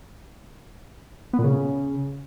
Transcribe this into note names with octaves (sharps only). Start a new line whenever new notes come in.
B3
A#2
C#3